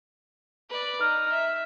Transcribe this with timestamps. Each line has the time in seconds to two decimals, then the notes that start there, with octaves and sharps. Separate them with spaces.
0.69 B4 D5
1.01 D#4 F6
1.30 E5